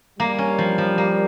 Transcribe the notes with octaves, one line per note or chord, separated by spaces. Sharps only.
G3 A#3
C#4
F3
F3
A#3